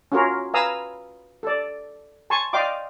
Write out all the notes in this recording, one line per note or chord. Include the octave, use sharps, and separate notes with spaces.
C#4 F4 F#4 G#4 A#4 C#5
B4 F5 G#5 A#5 D#6 E6
A4 D5
G#5 A5 C6 C#6
D5 D#5 F5 G5 C6 D6